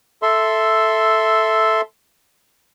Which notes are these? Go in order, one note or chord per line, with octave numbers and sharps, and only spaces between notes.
A4 E5 C6